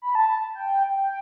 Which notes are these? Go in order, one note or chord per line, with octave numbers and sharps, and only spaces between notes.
B5
A5
G5
G5